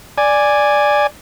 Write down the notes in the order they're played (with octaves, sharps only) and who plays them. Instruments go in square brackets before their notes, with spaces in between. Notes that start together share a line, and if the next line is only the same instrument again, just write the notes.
[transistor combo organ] D5 G#5